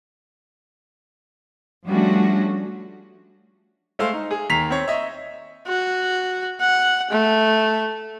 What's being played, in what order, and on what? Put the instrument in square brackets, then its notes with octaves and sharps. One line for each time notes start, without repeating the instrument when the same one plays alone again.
[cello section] F3 G3 A3 C#4 D4 F#4
[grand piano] G#3 A3 C5 F5 E6
D#4
G#4
D#2 A#5 B6 C7 F7
C4 C#5
D#5 E5
[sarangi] F#4
F#5
A3